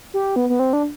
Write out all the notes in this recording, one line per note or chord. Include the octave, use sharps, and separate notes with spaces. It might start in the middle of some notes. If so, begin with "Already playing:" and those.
G4
B3
B3
C4
D4